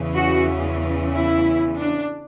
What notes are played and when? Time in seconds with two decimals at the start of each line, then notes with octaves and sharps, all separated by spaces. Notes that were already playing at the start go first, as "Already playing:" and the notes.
Already playing: E2 C#3 E3
0.16 F#4
1.13 E4
1.78 D4